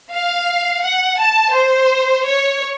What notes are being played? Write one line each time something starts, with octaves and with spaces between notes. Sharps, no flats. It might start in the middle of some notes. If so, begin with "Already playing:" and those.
F5
F#5
A5
C5
C#5